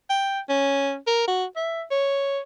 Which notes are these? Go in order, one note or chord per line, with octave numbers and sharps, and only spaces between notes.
G5
C#4
A#4
F#4
E5
C#5